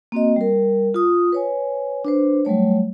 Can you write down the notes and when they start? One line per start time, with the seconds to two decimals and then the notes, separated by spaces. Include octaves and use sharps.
0.12 A#3 C4 F#4 D#5
0.36 G3 A#4
0.94 F4 D#6
1.32 B4 C#5 G#5
2.05 D4 B4 C5
2.45 F#3 G3 A3 C#5